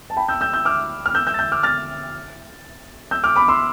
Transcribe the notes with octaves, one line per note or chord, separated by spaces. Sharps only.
A5
G5 B5
E6 G6
E6 G6
E6 G6
D6 F6
F6
E6 G6
E6 G6
A6
E6 G6
D6 F6
F6 A6
E6 G6
D6 F6
B5 D6
C6 E6